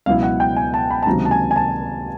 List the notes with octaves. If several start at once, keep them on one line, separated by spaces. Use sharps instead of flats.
C#2 B2 F#3 B3 E4 F5
F#5
G5
G#5
A5
B5
A5
C#2 C3 D#3 F#3 A#3 A#5
A5
G#5
G#5
A5